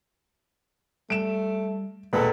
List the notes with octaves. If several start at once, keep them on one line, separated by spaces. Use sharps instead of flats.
G3 A3 D7 E7
E1 A#2 A#3 A4 B4